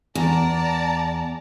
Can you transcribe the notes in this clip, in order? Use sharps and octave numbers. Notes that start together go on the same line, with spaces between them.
E2 D5 A5 A#5